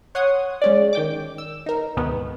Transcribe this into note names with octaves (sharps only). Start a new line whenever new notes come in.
C#5 F#5 C6 C#6 D#6
G#3 C#4 D5
D#3 G5 D6
E6
D#4 A#4
D2 G#2 B2 D#3 B3